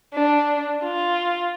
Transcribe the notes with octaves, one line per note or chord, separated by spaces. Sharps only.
D4
F4